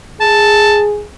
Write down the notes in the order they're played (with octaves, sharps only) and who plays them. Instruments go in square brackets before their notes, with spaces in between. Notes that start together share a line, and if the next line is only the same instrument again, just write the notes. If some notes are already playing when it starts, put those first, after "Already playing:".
[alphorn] G#4 [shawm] A5